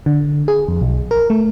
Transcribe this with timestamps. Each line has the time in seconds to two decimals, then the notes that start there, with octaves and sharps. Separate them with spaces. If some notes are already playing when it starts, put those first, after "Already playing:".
0.06 D3
0.48 G#4
0.68 F2
0.81 B1
1.11 A#4
1.30 A3